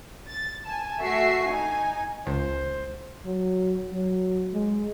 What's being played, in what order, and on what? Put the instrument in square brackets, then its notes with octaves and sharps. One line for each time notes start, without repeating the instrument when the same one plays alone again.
[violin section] A6
G#5 A5
A3 F#4 E5 C#6 C7
D#4 G#5
[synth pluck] C#2 [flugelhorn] C5
[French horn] F#3
F#3
G#3